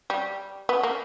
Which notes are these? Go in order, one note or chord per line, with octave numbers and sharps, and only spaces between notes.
G3
B3
A#3